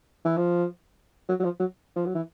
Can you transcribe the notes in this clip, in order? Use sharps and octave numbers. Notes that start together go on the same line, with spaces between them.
E3
F3
F#3
F#3
F3
F#3
F3
F#3
E3